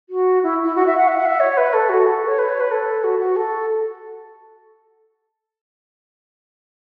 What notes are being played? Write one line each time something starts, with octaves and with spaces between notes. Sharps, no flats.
F#4
E4
E4
F#4
E5
F#5
E5
F#5
E5
C#5
B4
A4
F#4
A4
C#5
B4
C#5
B4
A4
F#4
F#4
A4